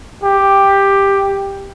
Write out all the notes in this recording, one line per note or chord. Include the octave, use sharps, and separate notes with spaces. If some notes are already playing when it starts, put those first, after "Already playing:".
G4